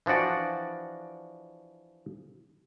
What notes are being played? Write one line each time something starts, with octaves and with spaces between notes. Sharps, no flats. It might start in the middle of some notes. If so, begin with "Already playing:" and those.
E3 F3 D4 F#4 D5